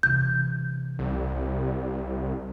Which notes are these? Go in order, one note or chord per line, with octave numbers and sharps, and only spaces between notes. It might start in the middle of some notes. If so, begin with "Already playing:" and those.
C3 E3 G6
C2